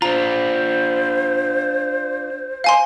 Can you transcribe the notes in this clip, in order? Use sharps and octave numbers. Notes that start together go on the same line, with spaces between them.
D4 F4 C5 A#5
F5 G#5 C6